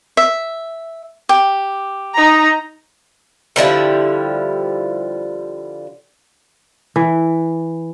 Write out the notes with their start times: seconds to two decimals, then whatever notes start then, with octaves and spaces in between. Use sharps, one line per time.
0.17 E5
1.29 G4
2.14 D#4 A#5
3.56 D3 F3 G3 E4
6.96 E3